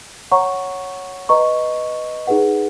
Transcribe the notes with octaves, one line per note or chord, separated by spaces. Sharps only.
C#5 F#5 A#5 C#6
B4 D#5 A#5 C#6
D#4 G#4 B4 F#5